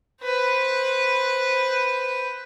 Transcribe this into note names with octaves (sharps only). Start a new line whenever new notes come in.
B4 C5